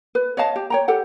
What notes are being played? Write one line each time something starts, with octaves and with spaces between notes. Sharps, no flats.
B4
C#5 D#5 F5 A5
G4
C#5 G5 A#5
G4 A4 F#5